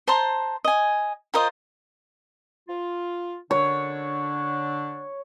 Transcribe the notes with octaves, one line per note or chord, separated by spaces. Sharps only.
C5 A5 A#5 C6
D#5 G#5
F4 A#4 C5 D#5
F4
D3 D4 C#5